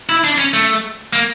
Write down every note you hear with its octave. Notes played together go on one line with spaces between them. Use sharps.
E4
D4
C#4
A3
A#3